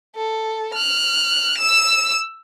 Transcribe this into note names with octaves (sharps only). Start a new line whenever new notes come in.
A4
F6 F#6
E6 E7